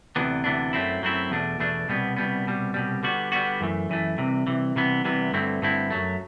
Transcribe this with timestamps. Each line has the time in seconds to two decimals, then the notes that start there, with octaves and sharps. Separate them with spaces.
0.16 D2 C3 E3 B3 D4
0.44 D2 C3 E3 B3 D4
0.73 F#2 F#3 A3 C4 E4
1.02 F#2 F#3 A3 C4 E4
1.30 E2 B2 A3 D4
1.59 E2 B2 A3 D4
1.88 C2 B2 G3 B3
2.17 C2 B2 G3 B3
2.45 C2 B2 G3
2.74 C2 B2 G3
3.03 D3 G3 B3 F#4
3.32 D3 G3 B3 F#4
3.61 F#2 E3 A3
3.89 F#2 E3 A3
4.18 C2 C3 E3
4.47 C2 C3 E3
4.75 C2 C3 E3 B3
5.04 C2 C3 E3 B3
5.33 G2 D3 A3 C4 E4
5.62 G2 D3 A3 C4 E4
5.90 F#2 F#3 A3